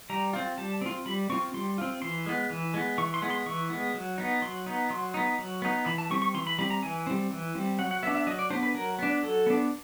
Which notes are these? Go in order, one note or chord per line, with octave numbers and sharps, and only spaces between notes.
G3 A#5
C4 F4
G3 A5
C4 F4
G3 B5
C4 F4 C#6
G3 C6
C4 F4
E3 C6
G#3 B3
E3
G#3 B3
E3 C#6
C6
G#3 B3
C6
E3 C#6
G#3 B3
F#3
B3 D#4
F#3 C6
B3 D#4
F#3 C6
B3 D#4
F#3
B3 D#4
E3 B5
A5
G3 C4 C#6
C#6
E3 C6
B5
G3 C4 B5
A#5
E3 G#5
G3 C4
E3
G3 C4
F#3 F#5
F#5
B3 D4 E5
E5
F#3 D#5
D5
B3 D4 C5
B4
F#3 A#4
B3 D4
F#3 A4
B3 D4